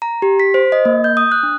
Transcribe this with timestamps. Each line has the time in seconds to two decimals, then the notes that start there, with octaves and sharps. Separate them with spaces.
0.02 A#5
0.22 G4
0.40 B6
0.54 C5
0.72 D#5
0.85 A#3
1.04 G6
1.17 D#6
1.32 F#6
1.43 D4